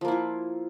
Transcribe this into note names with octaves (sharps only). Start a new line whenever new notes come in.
F3 A#3 E4 F4